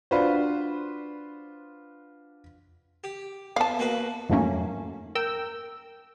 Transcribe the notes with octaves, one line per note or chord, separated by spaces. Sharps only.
D4 F4 F#4 B4 C5 D5
G4
E2 F5 A5
A#3 F#4 B4
F2 G#2 F#3 A3 A#3 C#4
A#4 G5 E6